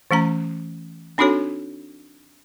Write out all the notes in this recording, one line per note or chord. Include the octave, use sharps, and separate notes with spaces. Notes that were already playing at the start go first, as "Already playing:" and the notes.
E3 A3 C#4 A#5
C4 D4 D#4 F#4 A4 C#5